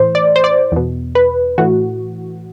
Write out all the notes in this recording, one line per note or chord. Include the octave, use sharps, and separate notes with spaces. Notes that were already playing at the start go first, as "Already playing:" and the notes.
Already playing: A2 E3 C5
D5
C5
D5
E2 B2
B4
A2 E3 F#4